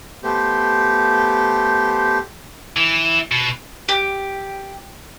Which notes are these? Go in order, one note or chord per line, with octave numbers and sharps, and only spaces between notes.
A3 B3 G4 C5
E3
B2
G4